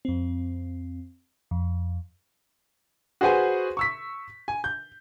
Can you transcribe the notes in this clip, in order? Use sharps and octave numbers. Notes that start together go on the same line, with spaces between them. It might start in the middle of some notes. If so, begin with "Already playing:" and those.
F2 C4
F2
F#4 G#4 B4 C5 F#5 G#5
C#6 E6 B6
G#5
G6